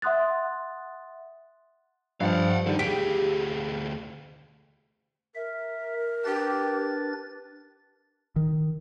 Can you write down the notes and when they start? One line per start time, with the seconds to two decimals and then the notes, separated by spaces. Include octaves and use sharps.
0.02 E5 F#5 C6 D#6 F#6 A6
2.20 G2 F3 F5 F#5
2.66 D#3 G3 D4 A4
2.79 D2 G4 G#4 B6
5.35 A#4 E5
6.25 D4 G4 B4 A6
8.36 D#3